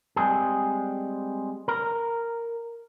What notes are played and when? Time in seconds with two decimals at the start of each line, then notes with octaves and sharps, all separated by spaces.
0.16 G3 G#3 C4 G#4
1.68 A#4